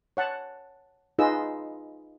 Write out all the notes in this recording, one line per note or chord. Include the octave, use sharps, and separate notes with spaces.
C#5 F#5 A5
D#4 F4 G#4 B4 D#5 E6